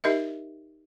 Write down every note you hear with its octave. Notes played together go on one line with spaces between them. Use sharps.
D#4 G4 A#4 D#5 E5